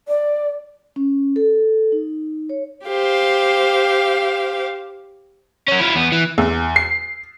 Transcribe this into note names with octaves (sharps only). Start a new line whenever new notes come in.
D5
C#4
A4
D#4
C#5
G4 C5 F5
F#3 C#4
E4 F4
E2 B3
E3
E2
C7